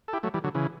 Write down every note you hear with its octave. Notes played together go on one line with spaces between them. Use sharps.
A4
E4 G4
F#3 A3
E3 G3
D3 F#3
C#3 E3